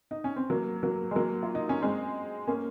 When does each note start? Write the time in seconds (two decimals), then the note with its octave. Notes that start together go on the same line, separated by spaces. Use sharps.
0.11 D#4
0.24 C#4
0.36 C4
0.50 F#3 A#3
0.83 F#3 A#3
1.11 G#3
1.15 F#3 A#3
1.43 F4
1.55 D#4
1.69 C#4
1.81 G#3 C4
2.47 A#3 C#4